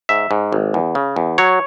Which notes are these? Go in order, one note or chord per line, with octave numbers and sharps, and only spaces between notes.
G#2 E5
G#2
G#1
E2
C#3
E2
F#3 C#5